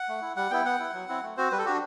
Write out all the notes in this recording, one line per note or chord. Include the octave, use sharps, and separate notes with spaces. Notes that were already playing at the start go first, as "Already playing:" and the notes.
Already playing: F#5
A3
E4
G3 F#5
B3 E4 G5
B3 F#5
E4
F#3
C4 E4
A3
C4 F#4 C5
G3 B4
A4
D4 F#4 G4